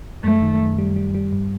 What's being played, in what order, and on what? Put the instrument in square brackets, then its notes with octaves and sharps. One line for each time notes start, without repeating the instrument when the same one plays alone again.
[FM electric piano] F#2 [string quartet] A3
[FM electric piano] D#3
F#2
G3
G3
G3
G2